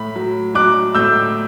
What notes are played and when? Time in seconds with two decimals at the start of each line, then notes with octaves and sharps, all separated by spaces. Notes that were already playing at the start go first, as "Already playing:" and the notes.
Already playing: A2 B5
0.16 F#3
0.54 F#3 D6 F#6
0.95 A2 E6 G6